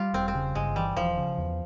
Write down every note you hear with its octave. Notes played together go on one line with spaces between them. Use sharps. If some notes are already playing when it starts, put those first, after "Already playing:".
Already playing: G3 F4 G4
E1 C4
C4
C#3
G1 G#3
E3 G3
E1 F3
C#3
E2